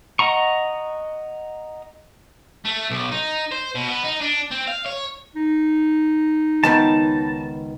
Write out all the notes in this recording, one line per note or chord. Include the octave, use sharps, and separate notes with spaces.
D#5 F#5 A#5 C#6
A3
B1
D#4
C5
B2
B3
D#4
D4
C4
F5
C#5
D#4
C#2 D#3 B3 A5